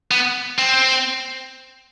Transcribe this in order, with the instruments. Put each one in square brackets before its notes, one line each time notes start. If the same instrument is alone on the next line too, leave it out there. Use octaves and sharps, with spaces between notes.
[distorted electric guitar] B3
C4